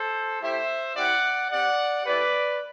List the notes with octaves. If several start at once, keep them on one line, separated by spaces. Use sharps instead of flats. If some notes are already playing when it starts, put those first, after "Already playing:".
Already playing: A4 C5
A3 E4 G4 C5 E5
C4 E4 G4 D5 F#5
C4 G4 D5 F#5
A3 E4 G4 B4 D5